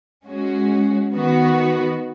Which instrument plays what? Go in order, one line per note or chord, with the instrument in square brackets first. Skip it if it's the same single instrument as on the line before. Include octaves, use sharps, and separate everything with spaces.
[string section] G#3 C#4 F#4
D#3 B3 F#4 B4